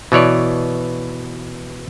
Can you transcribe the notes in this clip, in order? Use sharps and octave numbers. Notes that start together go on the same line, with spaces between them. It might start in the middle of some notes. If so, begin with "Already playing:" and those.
B2 E3 C#5 D5